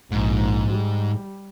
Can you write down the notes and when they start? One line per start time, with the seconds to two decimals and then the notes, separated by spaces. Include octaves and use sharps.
0.12 A#1 G#2
0.71 G3